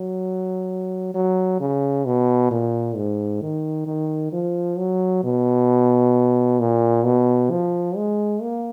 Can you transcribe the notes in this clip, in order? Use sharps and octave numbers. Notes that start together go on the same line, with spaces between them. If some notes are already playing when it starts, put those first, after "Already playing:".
Already playing: F#3
F#3
C#3
B2
A#2
G#2
D#3
D#3
F3
F#3
B2
A#2
B2
F3
G#3
A#3